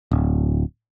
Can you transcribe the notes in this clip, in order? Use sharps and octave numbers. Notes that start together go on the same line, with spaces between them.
D1